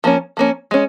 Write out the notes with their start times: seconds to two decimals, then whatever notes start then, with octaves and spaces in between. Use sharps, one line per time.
0.04 F3 A#3 C#4
0.37 F3 A#3 C#4
0.71 G#3 C#4